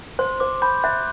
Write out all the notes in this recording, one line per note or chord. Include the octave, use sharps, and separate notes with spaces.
C5 C6
C5 D6
B5 G6
E5 F#6